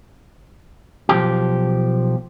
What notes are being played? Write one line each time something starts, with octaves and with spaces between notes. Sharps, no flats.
B1 F3 G4